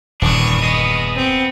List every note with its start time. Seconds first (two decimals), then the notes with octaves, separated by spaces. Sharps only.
0.22 D#1 F#2 E3 D4 C#6 D#6
0.63 B3 G#4 D#5
1.16 C4